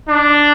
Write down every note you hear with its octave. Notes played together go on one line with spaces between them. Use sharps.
D4